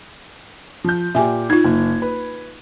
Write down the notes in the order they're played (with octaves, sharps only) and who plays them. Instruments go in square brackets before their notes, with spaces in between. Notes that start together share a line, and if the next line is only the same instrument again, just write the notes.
[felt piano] F3 G6
[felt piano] A#2 G4 [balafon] E5 G#5
[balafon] D#4 F4 [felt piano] G#6
[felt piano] F#1
B4